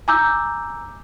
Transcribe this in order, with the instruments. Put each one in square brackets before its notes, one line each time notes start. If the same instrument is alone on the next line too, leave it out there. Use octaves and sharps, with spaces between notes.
[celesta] G#5 A#5 D6 E6 G6